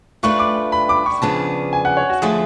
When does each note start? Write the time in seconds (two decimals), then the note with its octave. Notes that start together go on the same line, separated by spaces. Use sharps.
0.23 A3 D4 F4 B4 C#6
0.39 D6
0.72 B5
0.89 D6
1.06 C#6
1.22 C#3 F3 B3 D4 G#4 A5
1.73 G#5
1.85 F#5
1.97 C#5
2.10 F#4
2.22 D3 F3 A3 F4 G#4